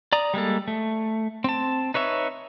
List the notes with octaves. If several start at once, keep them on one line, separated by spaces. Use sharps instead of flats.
D5 A#5 D#6
G3 G#3 A#3 A4
A3
C4 A5
D#4 B4 C#5 E5